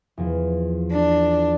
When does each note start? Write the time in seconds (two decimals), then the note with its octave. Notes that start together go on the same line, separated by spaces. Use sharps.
0.18 E2 F3
0.92 D4